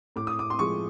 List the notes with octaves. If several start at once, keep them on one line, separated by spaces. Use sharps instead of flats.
A2 D6
D#6
D6
C6
F3 G#3 C#6